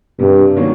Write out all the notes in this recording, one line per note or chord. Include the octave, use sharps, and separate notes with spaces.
G2 C3
D#3 F#3 A#3 C#4